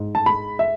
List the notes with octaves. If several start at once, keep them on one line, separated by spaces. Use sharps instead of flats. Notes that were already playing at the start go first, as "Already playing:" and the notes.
Already playing: G#2
A5
G#3 B5
E5